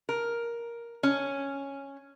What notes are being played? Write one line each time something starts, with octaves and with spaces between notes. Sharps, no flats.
A#4
C#4